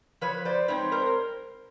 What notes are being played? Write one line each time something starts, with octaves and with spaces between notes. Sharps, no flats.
F3 B4 C#5
C5 D5
G#3 C4 D#4 B4 C#5
A#4 C5